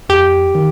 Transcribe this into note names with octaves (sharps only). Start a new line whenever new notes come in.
F2 G4
D#3